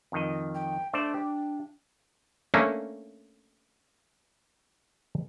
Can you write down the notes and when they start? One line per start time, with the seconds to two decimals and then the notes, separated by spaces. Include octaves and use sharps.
0.12 F2 D#3 D#5
0.55 G5
0.93 A3 D4 C5 D5
1.14 G4
2.54 A3 A#3 C#4 D4